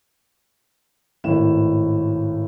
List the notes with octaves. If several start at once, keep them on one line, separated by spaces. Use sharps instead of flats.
G#1 A2 E7